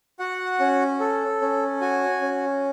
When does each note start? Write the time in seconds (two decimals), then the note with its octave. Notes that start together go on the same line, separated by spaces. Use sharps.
0.19 F#4 F#5
0.60 C#4
1.00 A4
1.41 C#4
1.81 F#4 G#5
2.21 C#4